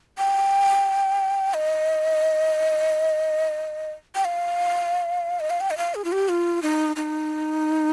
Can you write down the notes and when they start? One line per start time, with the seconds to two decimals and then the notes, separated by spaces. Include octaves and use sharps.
0.18 G5
1.54 D#5
4.15 G5
4.25 F5
5.40 D#5
5.50 F5
5.61 G5
5.71 D#5
5.78 F5
5.95 G#4
6.05 F4
6.12 G4
6.29 F4
6.62 D#4
6.96 D#4